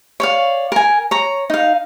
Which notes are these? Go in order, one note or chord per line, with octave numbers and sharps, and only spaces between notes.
C#5 D5 F5
A#4 G#5
C#5 A#5
D#4 F5